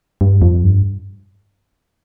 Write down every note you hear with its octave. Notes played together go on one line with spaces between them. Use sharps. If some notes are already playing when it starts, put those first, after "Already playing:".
G2
F2
G2